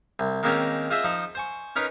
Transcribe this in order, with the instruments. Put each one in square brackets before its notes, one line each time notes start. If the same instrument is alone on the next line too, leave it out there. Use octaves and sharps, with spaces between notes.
[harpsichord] C2
D#3 G#3 A#3 C4 C#4
F4 G#4 C5 D#5 E5
F3 D#4 C5
C5 G#5 C#6
C#4 D#4 A#4 B4